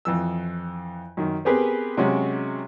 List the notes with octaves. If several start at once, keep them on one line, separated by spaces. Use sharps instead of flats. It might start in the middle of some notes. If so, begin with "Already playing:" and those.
F2 E3 E6
F#2 D#3
B3 C4 G4 G#4 A#4 B4
C3 F#3 G#3 C#4 F#4